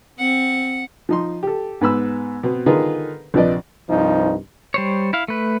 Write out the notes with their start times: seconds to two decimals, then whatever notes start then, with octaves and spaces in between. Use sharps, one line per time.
0.19 C4 F#5
1.09 F3 D#4 C6
1.43 G4 A4
1.81 G#2 B3 B5 E6
2.43 B2 B3 C4
2.66 D3 D#3 D#4 F4 G#4 B4
3.34 A#1 C3 F3 B4 D5 D#5
3.89 C2 G2 F3 D#4
4.74 G3 C5 C#5
5.13 E4 F5
5.28 A3 B4